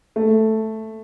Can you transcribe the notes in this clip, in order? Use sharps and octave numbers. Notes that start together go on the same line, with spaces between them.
A3